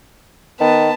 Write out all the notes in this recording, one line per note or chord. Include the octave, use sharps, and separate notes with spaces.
D#3 B3 A5